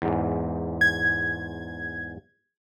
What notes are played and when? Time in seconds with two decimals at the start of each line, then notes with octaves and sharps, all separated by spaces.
0.02 E2 G#2
0.81 G#6